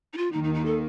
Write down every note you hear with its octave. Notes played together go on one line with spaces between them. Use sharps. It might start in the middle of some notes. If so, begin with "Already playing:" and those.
D#4
F4
D#2 D#3 A#3 D#4
D#4
D#4
A4